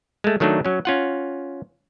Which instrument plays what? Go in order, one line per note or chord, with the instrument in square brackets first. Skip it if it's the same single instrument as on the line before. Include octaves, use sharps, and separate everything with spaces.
[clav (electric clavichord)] G#3 A3
D#3 F#3 A3 D4 D#4
F#3 C#4
C#4 F4 F#5